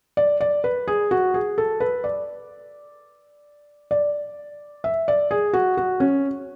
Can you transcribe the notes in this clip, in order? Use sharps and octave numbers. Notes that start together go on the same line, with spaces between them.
D5
D5
B4
G#4
F#4
G#4
A4
B4
D5
D5
E5
D5
G#4
F#4
F#4
C#4